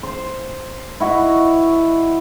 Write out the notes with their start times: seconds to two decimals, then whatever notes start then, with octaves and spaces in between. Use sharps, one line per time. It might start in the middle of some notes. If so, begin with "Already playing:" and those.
0.03 C5
1.00 E4 F#4 D#5